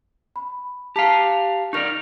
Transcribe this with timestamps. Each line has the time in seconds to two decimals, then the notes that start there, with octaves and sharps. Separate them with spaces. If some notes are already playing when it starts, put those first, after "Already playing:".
0.36 B5
0.96 G4 F5 A5 A#5 B6
1.73 D#4 A#4 D5 C#6 F7